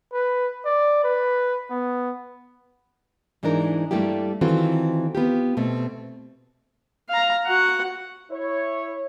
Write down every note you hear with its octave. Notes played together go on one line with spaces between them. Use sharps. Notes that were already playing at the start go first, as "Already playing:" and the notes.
B4
D5
B4
B3
G#2 E3 G#3 D4 D#4 A#4
G2 G3 A3 A#3 E4 G4
D#3 E3 C4 F4 F#4 A4
B3 F4 G4
B2 A3 C4
F5 A#5
F#4 F#5
E4 C#5